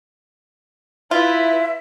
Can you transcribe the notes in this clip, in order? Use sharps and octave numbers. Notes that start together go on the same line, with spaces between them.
E4 F4 B4 E5